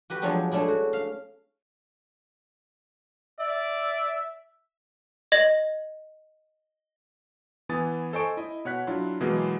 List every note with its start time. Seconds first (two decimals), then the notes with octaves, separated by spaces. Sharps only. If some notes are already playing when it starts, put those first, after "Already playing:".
0.10 F#4 G4 B4
0.22 F3 F#3 G#3 B3 C4 D4
0.51 G#3 A3 C#4 D4 E4
0.68 F#4
0.93 F5
3.40 D5 E5
5.32 D#5 A#6 F#7
7.69 E3 B3 G#5 D#6 A6
8.13 A4 C5 D#5 G#5 C#6 D7
8.37 E4 D#5
8.65 B2 C#5 F#5 F#6 B6
8.87 F#3 D4 E4 F4
9.20 B2 E3 F#3 G#3 A#3 B3